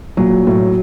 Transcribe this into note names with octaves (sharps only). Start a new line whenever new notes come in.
A#2 F#3
A2